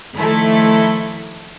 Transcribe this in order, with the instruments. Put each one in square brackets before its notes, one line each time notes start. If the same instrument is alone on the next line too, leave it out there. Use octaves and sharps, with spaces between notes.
[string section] D#3 F3 A3 E4 A4